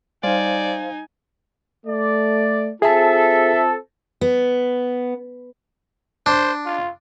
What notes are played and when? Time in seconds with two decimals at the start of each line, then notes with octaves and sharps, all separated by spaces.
0.24 G3 D#4 C5 D5 F5 G#5
1.86 A3 D5
2.82 C4 F4 G#4 A4 E5 A5
4.21 B3
6.26 D4 C5
6.65 F4